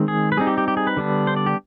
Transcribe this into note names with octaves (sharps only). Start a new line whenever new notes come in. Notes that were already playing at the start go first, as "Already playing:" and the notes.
Already playing: D#3 G#3 C4
G#4
B4
G3 C4 D#4 G#4
G4
G4
G4
G#4
B4
D3 G3 B3 D4
C5
D5
G4